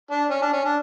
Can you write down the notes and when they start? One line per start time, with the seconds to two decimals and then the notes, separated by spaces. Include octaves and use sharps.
0.11 D4
0.30 C#4
0.42 D4
0.53 C#4
0.65 D4